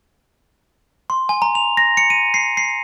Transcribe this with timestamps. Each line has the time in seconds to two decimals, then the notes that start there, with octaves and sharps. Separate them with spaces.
1.10 C6
1.29 G#5
1.42 A#5
1.55 F7
1.77 A#6
1.97 C#7
2.10 D#7
2.34 C7
2.57 C7